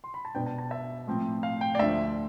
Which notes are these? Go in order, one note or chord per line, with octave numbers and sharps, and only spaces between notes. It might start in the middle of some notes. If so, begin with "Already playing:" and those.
C6
B5
A5
B2 B3 D4 G5
A5
A5
E5
A2 F3 C4
F5
G5
D5
D2 D3 F3 E5